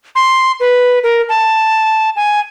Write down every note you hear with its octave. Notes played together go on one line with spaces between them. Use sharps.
C6
B4
A#4
A5
G#5